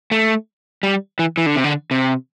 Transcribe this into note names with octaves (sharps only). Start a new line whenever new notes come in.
A3
G3
E3
E3
D3
C3
D3
C3